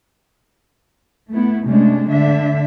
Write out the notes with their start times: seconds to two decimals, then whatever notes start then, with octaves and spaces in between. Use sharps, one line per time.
1.31 A3 B3 E4
1.66 C3 G#3 A3 C#4 D4
2.09 D3 D4 E5